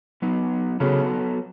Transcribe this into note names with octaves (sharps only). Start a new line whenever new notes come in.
F#3 B3 D#4
C#3 F#3 B3 C#4 F#4 A4